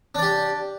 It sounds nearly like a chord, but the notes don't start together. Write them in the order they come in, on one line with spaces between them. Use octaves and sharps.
D4 D5 G4